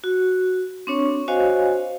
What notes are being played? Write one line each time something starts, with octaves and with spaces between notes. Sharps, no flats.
F#4
C4 D4 C#5 C#6
F#4 C5 C#5 D#5 F5 G#5